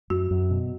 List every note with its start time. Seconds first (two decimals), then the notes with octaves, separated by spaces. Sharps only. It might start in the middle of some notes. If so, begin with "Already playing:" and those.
0.10 F#2 F#4
0.31 F#2
0.51 B2